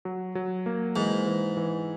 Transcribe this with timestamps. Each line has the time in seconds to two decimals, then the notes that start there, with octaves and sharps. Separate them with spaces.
0.05 F#3
0.35 F#3
0.66 A#3
0.96 G#2 E3
1.26 E3
1.57 E3